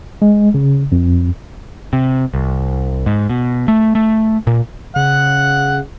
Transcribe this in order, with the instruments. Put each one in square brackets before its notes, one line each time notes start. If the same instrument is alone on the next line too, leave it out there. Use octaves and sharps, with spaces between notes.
[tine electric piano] G#3
C#3
F2
[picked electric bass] C3
C2
G#2
B2
A3
A3
A#2
[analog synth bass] C#3 [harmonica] F#5